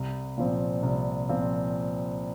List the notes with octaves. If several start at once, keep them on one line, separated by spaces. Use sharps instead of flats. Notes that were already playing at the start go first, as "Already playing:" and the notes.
Already playing: C2
A#2 F3 C4
C2
A#2 F3 C4